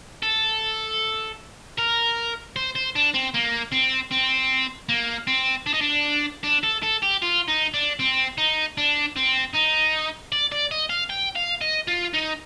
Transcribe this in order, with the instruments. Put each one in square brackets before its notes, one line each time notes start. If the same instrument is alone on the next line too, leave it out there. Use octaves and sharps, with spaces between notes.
[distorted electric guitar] A4
A#4
C5
C5
D4
C4
A#3
C4
C4
A#3
C4
D4
D#4
D4
D4
A4
A4
G4
F4
D#4
D4
C4
D#4
D4
C4
D#4
D5
D5
D#5
F5
G5
F5
D#5
F4
D#4